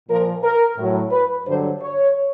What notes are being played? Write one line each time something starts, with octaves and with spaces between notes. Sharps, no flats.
A#2 F3 A#4
A#4
A2 F#3
B4
G2 D3 F#3 C5
C#5